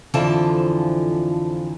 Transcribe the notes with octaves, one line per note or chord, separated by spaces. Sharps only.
F2 D3 E3 F3 F4 A5